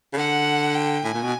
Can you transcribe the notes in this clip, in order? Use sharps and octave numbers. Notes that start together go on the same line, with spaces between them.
C#3
D3 F#5
G5
A2 G#5
A#2
B2